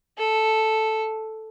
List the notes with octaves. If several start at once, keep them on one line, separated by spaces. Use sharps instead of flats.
A4